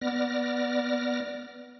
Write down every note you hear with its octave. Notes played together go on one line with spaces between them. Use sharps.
B3 D5 F6 A#6